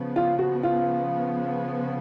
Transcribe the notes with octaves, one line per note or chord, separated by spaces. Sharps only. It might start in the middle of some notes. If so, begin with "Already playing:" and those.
Already playing: C#3 F3 B3
F4
F#4
F4